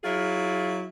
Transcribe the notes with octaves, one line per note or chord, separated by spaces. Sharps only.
F#3 E4 F4 G#4